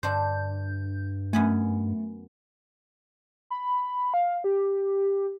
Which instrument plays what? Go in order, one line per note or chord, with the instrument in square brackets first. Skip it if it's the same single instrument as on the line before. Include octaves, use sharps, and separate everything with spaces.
[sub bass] G2 [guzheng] D3 D4 C5 [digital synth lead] G6
[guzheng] F#2 B3 G#5 [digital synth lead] A3
[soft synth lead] B5
F5
G4